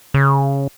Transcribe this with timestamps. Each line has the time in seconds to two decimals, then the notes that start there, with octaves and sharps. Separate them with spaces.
0.14 C#3